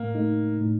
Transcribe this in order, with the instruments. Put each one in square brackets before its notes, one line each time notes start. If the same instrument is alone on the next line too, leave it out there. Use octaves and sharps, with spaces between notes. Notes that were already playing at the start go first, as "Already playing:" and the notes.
Already playing: [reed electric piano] A2 [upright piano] A#3
[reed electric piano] A3 D#4
A2